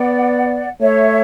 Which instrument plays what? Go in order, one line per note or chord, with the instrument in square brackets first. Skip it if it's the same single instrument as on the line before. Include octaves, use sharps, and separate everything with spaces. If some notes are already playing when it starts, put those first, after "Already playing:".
Already playing: [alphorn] B3 [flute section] D5 F#5
[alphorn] A3 [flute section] C#5 E5